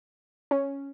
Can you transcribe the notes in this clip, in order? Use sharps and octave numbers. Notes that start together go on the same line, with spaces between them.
C#4